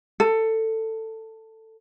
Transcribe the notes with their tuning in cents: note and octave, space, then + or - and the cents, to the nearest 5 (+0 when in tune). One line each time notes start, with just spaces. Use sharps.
A4 +15